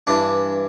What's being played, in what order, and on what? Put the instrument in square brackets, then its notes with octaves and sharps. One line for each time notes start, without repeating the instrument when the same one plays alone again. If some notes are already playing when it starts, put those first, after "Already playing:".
[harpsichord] G2 E3 D4